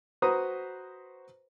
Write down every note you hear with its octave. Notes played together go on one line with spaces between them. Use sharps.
F#4 B4 C5 A#5 D#6